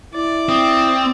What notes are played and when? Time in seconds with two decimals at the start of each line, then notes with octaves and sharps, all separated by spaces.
0.14 E4 D5
0.49 C4 D#6